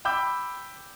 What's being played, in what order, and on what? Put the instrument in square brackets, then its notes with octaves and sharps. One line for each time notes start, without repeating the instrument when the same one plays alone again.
[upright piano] G5 B5 D6 E6 G6